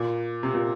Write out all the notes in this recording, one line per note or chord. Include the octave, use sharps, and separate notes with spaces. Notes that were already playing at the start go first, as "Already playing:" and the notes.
Already playing: A#2
C3
A#2